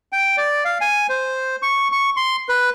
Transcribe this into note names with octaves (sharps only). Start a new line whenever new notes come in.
G5
D5
F5
G#5
C5
C#6
C#6
C6
B4